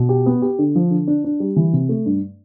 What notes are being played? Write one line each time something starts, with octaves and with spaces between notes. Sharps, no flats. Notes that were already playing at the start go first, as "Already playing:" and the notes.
Already playing: B2
G4
B3
G4
D3
F3
D3
D4
D4
G3
E3
C3
A3
G2